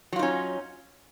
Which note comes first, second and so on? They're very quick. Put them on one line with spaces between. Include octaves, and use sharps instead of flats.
F#3 F4 D#4 C#4